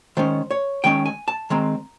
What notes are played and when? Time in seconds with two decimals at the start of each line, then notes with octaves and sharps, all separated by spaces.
0.17 D#3 G#3 C#4 C5
0.51 C#5
0.84 D#3 G#3 C#4 G5
1.06 G#5
1.28 A5
1.50 D#3 G#3 C4 A#5